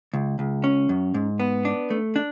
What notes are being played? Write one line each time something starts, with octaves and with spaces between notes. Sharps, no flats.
C#2
C#2
C#4
F#2
G#2
B3
D4
A3
D4